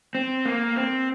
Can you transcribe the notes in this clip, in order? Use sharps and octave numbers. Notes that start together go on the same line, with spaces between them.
C4
A#3
C4